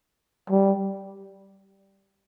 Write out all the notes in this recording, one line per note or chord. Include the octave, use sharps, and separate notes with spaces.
G3